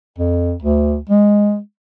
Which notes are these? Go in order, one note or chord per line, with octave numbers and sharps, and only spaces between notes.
F2
D2
G#3